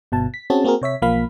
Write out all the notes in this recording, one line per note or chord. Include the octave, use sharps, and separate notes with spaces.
G1 B2 A5
B6
C4 C#4 F#4 G#4 A5
A#3 C4 F#4 G#4 A#4
C3 C#5 E5 B6
B1 F3 A#3 F5 B5 B6